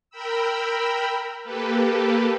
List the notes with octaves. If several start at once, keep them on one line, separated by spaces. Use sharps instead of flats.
A#4 G5 B5 E6
A#3 G4 A4 B4